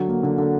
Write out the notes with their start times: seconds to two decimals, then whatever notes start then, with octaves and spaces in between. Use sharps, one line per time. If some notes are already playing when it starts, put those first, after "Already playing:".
Already playing: D3 F#3
0.08 A#3
0.23 D3
0.38 D3